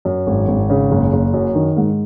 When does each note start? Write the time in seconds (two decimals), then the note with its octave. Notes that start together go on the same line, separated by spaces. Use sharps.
0.05 F#2
0.27 G#1
0.48 G#1
0.70 C#3
0.91 F#1
1.13 F#1
1.34 F#2
1.55 D#3
1.77 G#2